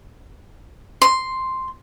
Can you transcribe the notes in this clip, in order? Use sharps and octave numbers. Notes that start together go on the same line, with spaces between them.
C6